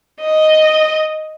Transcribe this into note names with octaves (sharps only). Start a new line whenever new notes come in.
D#5